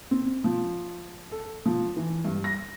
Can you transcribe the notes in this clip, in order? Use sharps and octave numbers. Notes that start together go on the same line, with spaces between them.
C4
F3
A4
F3
E3
G2
A#6